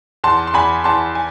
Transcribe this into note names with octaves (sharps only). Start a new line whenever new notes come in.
E2 A5 C6
C6
E2 G#5 B5
E2 A5 C6
G#5